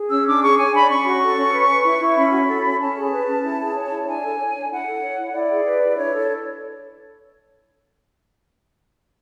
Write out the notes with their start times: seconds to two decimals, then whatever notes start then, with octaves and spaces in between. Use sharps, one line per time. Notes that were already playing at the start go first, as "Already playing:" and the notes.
Already playing: G#4
0.09 C#4 E6
0.25 D4 D6
0.42 G#4 C#6
0.57 C#5 G#5
0.73 D4 B5
0.88 C#4 C#6
1.05 F#4
1.21 A4
1.37 C#4
1.52 B4
1.68 B4
1.84 E4
2.00 E4
2.16 C#4 B5
2.31 F#4
2.48 A4
2.64 C#4
2.79 C#4 A5
2.95 G#4
3.12 B4
3.27 C#4
3.43 E4
3.59 G#4
3.75 C#5
3.90 E4
4.06 D4 G#5
4.22 A4
4.39 C#5
4.54 D4
4.70 E4 F#5
4.86 A4
5.02 C#5
5.18 E4
5.33 E4 D5
5.49 G#4
5.66 B4
5.81 E4
5.97 D4 C#5
6.12 A4
6.28 C#5